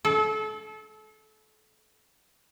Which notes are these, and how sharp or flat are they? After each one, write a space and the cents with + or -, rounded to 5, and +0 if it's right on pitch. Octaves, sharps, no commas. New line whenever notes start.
A4 -30